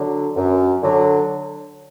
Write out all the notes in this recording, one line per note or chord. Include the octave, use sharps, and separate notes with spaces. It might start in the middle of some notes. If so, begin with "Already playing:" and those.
Already playing: D3 F#3
F#2
D3 F#3